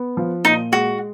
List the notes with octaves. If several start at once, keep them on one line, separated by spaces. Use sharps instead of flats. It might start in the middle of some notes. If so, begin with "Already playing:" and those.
Already playing: B3
F3
A#2 D#4
G#3 F#4